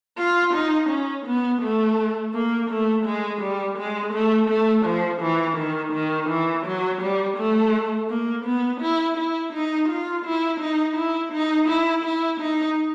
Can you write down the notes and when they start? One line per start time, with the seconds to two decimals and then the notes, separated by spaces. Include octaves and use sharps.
0.18 F4
0.54 D#4
0.90 C#4
1.26 B3
1.62 A3
2.34 A#3
2.70 A3
3.06 G#3
3.42 G3
3.78 G#3
4.13 A3
4.49 A3
4.85 F3
5.22 E3
5.57 D#3
5.93 D#3
6.29 E3
6.66 F#3
7.01 G3
7.37 A3
8.09 A#3
8.45 B3
8.81 E4
9.17 E4
9.53 D#4
9.89 F4
10.25 E4
10.60 D#4
10.97 E4
11.32 D#4
11.68 E4
12.04 E4
12.41 D#4